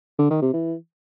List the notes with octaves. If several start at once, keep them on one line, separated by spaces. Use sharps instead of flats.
D3
D#3
C3
E3